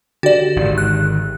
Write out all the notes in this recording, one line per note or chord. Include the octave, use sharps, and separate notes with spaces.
D3 F#4 G4 D5 A6
G#1 D#3
F#6